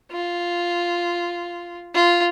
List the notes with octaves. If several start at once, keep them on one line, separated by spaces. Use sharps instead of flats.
F4
F4